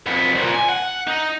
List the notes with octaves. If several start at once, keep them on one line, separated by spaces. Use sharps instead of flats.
F2 B3
C2 A#2
G#5
F#5
D#4